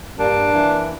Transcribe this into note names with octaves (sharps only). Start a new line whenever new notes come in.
G2 A#3 D4
E3